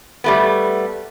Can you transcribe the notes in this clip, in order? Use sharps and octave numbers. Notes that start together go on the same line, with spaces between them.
G3 A3 B3